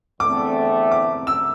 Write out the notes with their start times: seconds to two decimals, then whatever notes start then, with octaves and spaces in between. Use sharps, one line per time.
0.20 E2 D3 A3 C4 D6
0.92 D6
1.27 E6